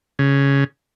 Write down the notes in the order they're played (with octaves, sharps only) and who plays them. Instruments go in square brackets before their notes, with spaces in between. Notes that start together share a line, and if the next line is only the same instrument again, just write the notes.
[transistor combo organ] C#3